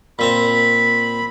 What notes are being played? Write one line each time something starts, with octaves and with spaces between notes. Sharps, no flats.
A#2 C4 A#5 B5